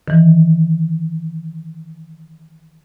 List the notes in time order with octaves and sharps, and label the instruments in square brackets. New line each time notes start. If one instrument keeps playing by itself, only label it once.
[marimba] D#3 E3